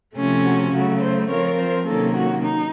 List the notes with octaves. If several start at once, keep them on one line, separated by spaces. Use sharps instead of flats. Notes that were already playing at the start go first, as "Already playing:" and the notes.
C3 F3 A3 C#4
F#4
C#3 F#3 A3 F#4
C5
F3 C4 F4 A#4 C#5
C5
C3 D#3 F#3 A#3 C#4 A4
F#4
D#4